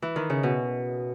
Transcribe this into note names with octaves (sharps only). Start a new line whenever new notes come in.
E3
D#3
C#3
B2